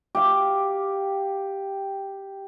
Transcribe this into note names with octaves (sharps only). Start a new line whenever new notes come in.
G4 F5